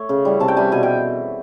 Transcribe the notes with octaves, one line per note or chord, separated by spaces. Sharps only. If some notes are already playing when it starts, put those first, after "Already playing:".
Already playing: A3 C#5
C#3
E3 G3
C3 A5
G5
E3 G3 G#5
B2 G#5
G5